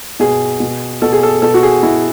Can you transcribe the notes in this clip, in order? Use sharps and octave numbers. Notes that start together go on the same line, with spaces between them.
B2 G#4
B2
B2 A4
G#4
A4
B2 A4
F#4
G#4
B2 E4